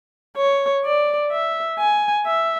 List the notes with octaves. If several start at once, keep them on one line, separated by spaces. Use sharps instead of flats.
C#5
D5
E5
G#5
E5